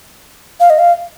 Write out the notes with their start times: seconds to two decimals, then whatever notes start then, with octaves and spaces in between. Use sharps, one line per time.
0.60 F5
0.70 D#5
0.79 F5